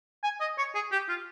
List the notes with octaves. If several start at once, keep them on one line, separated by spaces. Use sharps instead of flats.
G#5
D#5
C#5
G#4
G4
F4